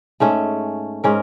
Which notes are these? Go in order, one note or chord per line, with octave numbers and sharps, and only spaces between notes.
G#2 A3 C#4
G#2 C#4 A#4